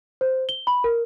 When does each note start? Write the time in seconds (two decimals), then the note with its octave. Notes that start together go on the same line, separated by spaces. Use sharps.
0.21 C5
0.49 G7
0.67 B5
0.84 A#4